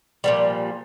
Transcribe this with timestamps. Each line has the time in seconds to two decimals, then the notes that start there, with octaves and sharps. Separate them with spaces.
0.24 A#2 F3 G3